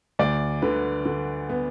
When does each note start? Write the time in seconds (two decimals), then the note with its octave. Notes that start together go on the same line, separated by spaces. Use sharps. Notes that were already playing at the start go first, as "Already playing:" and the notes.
0.19 D2 D5
0.62 D3 B4
1.06 D3
1.50 B3